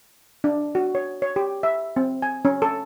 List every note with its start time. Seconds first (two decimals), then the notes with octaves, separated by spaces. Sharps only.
0.44 D4
0.75 F#4
0.95 C#5
1.22 C#5
1.36 G4
1.63 E5
1.96 C4
2.22 G#5
2.45 C#4
2.62 A4